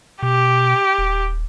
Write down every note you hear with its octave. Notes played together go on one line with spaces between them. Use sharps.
B2 G4
D#1